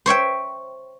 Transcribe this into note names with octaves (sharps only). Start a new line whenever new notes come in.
C5 C#5 E5 G5